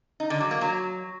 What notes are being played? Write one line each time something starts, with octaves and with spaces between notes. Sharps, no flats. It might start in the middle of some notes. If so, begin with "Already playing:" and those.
D#4
D3
F#3
A#3
F#3